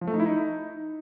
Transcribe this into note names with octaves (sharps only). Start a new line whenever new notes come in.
F3
A3
D#4
E4
D#4